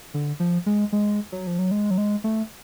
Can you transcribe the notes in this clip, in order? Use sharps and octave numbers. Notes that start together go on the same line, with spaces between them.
D3
F3
G#3
G#3
F#3
F3
F#3
G#3
F#3
G#3
A3